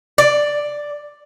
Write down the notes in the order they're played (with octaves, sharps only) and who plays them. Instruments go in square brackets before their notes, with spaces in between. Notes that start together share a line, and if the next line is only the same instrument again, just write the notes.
[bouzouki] D5